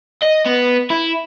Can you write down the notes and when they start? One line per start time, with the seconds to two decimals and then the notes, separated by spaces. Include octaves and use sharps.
0.22 D#5
0.45 B3
0.90 E4